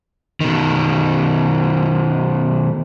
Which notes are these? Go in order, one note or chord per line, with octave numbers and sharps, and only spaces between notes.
B2 D#3